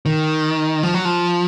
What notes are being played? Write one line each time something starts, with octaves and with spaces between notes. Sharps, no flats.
D#3
F3
F#3
F3